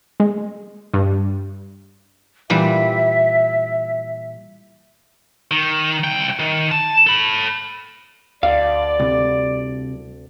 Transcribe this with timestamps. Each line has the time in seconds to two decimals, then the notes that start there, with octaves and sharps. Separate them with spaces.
0.20 G#3
0.94 G2
2.50 A#2 E3 G3 E5
5.51 D#3
6.04 C2 G5
6.39 D#3
6.72 A5
7.07 A4 B5
8.43 D2 D5 F5
8.99 C2